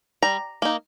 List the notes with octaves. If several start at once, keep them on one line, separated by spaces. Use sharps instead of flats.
G3 A#5
A#3 D#4